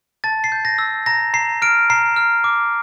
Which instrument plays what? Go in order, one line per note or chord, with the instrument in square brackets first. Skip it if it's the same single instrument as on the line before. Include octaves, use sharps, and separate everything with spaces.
[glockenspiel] A5 A6
C7
G6
A#6
E6
A#5 A#6
A#5 C7
F6 D7
A#5 C7
F6
D6